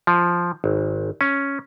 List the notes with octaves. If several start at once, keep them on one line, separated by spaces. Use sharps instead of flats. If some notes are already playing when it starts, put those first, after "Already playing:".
F3
G#1
C#4